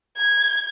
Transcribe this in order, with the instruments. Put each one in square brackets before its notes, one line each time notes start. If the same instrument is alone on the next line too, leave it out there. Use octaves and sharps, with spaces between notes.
[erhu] G#6